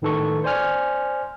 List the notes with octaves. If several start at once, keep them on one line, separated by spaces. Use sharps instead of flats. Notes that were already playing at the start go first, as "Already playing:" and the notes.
A2 D#3 D#4 A4 B4 C#6
C5 D5 G#5 F6